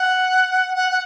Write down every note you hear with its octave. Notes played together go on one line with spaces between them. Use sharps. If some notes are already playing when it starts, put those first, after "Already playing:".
Already playing: F#5
F#5
F#5